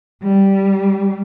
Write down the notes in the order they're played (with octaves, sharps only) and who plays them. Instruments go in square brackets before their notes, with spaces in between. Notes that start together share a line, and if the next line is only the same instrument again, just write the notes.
[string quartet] G3